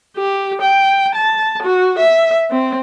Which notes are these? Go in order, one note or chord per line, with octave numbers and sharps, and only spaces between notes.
G4
G5
A5
F#4
E5
C4